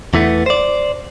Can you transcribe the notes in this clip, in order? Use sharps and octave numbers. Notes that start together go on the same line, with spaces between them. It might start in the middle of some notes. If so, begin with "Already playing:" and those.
E2 E3 A3 B3
C5 D5